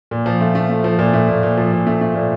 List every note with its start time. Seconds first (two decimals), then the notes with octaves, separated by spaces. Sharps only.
0.11 A#2
0.26 F3
0.40 A3
0.55 A3
0.70 A3
0.84 F3
0.99 A#2
1.14 A3
1.28 A#2
1.43 A#2
1.58 F3
1.72 A#2
1.87 A3
2.01 A3
2.15 A#2